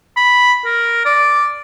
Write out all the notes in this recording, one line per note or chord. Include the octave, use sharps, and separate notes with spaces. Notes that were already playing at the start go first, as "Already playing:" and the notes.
B5
A#4
D5